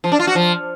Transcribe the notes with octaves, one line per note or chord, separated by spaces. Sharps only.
F3
D4
F4
F#4
F3